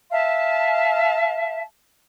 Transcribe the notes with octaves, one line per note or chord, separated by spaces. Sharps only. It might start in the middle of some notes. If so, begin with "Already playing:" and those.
E5 F5 A5